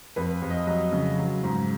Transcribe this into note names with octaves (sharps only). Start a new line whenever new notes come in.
F2 B4
F2
D#5
F#3 D#5
C#3
F#3
G#2